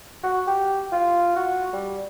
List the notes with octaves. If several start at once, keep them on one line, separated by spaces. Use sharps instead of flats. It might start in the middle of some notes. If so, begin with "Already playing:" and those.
F#4
G4
F4
F#4
G3